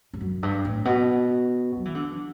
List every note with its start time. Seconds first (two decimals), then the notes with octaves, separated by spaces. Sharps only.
0.13 G2
0.21 F#2
0.43 G2
0.65 A2
0.85 B2
1.77 F#3
1.85 E3
1.95 D3